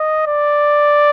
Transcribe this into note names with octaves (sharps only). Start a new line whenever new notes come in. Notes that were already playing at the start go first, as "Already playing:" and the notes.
Already playing: D#5
D5